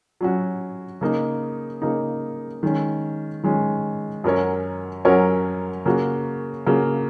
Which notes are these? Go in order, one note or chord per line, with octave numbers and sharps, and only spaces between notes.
F#3 C#4 F#4
C#3 A#3 D#4
C#3 A#3 D#4
D#3 G#3 C#4
D#3 G#3 C#4
F#2 F#3 C#4 A#4 C#5
F#2 F#3 C#4 A#4 C#5
C#3 A#3 F#4
C#3 A#3 F#4